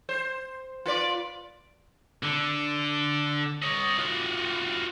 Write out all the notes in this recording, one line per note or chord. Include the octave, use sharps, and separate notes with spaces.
C5
F4 B4 D5
D3
C#5 D#5
F4 F#4